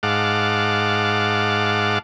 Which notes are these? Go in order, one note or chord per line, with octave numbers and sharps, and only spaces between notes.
G#2 F5 F#5 A5 D6